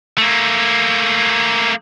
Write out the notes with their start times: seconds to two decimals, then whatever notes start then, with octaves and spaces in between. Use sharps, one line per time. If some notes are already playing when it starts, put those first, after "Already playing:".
0.18 A3 A#3